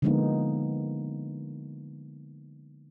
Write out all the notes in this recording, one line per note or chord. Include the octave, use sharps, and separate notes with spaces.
D3 F3 G#3 A#3 B3 D#4